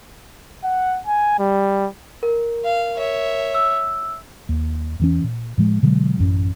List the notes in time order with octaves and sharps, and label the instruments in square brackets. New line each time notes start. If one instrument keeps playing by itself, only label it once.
[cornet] F#5
G#5
G3
[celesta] A#4
[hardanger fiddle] F5
C#5 E5
[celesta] E6
[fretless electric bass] D#2
E2 E3 C#4
A#2
A2 F3 G#3
B2 D3 F#3 G#3
A1 F#2 C#4